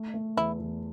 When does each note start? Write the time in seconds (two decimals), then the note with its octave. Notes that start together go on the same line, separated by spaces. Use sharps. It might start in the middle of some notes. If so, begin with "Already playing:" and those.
Already playing: A3
0.14 A3
0.37 E2 E4
0.59 E2